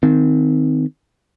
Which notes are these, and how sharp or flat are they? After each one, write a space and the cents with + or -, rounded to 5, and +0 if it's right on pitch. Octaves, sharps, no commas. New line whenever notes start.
D#3 +0 C4 -20